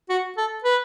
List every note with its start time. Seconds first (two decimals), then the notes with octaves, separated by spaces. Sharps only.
0.09 F#4
0.37 A4
0.64 B4